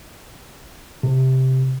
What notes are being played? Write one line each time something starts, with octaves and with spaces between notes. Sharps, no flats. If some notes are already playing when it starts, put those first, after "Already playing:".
C3